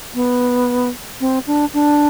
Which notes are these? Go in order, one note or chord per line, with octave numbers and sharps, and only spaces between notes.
B3
C4
D4
D4